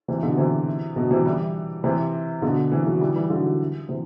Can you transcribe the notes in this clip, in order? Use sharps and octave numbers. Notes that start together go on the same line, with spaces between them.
C3 E3
B2 D3
C3 E3
B2 D3
C3 E3
E3 G3
C3 E3
B2 D3
C3 E3
D3 F#3
E3 G3
E3 G3
D3 F#3
C3 E3